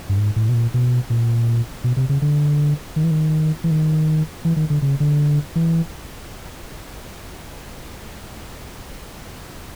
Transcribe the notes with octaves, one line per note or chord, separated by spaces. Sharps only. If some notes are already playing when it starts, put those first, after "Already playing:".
G2
G#2
A2
B2
A#2
B2
A#2
B2
C3
C#3
D3
D#3
E3
D#3
E3
D#3
E3
D#3
D3
C#3
D3
E3